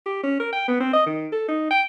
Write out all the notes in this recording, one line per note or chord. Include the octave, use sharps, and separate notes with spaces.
G4
C#4
A#4
G5
B3
C4
D#5
D#3
A4
D#4
G5